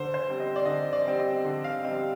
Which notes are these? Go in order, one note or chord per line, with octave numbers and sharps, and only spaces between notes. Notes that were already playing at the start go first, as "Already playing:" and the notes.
Already playing: D3 C5
C5
G3 C4
D#5
D5
D3 D#5
D5
G3 C4
D#5
D3
F5
G3 C4 D#5